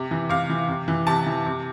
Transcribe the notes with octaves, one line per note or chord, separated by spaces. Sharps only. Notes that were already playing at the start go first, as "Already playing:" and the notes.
Already playing: C3
E3
C3 F5
E3
C3
E3
C3 A5
E3
C3